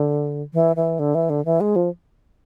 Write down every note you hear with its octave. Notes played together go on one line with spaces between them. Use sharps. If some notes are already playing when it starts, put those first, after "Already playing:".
Already playing: D3
E3
E3
D3
E3
D3
E3
G#3
F3